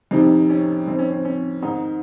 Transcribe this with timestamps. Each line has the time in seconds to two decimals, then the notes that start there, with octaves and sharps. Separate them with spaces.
0.11 F2 C3 D#3 D#4
0.50 C#4
0.87 F2 D#3 C4
0.99 C#4
1.11 C4
1.25 C#4
1.62 G#2 D#3 D#4